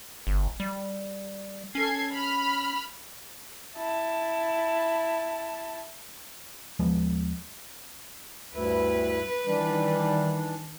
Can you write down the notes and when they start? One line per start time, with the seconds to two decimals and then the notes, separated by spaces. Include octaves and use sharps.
0.27 G1
0.60 G3
1.75 C#4 A4 G#6 C7
2.12 B5 F6
3.77 E4 A5
6.79 D#2 F3 G#3 B3
8.54 D2 G2 E4 B4
9.47 D#3 E3 G3 D4